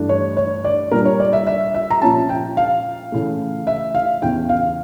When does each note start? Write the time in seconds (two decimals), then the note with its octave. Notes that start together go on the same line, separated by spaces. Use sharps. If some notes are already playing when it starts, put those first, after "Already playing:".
Already playing: G2 E3 A3 D4
0.09 C#5
0.37 C#5
0.64 D5
0.92 A#2 G3 D4 A#4
1.05 C#5
1.20 D5
1.33 E5
1.47 E5
1.74 E5
1.90 A#5
2.02 A#2 F3 C#4 A5
2.29 G5
2.57 F5
3.12 C#3 E3 A3
3.67 E5
3.95 F5
4.22 E2 C#3 E3 G5
4.49 F5